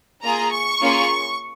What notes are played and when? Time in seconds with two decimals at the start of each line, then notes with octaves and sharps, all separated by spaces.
0.23 A#3 F4 G#4 A#5
0.52 C#6
0.81 A#3 C#4 F4 G#4